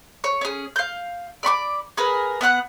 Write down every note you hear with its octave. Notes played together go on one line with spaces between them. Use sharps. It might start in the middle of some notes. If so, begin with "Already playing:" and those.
C#5
C#4 G#4
F5 G6
D5 B5 C#6 D6
G#4 A#4 B4
B3 E5 F#5 F#6